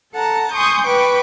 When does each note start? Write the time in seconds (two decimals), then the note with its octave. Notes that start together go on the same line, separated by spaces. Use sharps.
0.13 A4 F#5 A5 A#5
0.52 G#5 C6 C#6 D#6 G6
0.84 B4 G5 C#6 D6